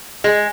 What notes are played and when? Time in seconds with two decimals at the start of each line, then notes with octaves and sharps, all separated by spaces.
0.24 G#3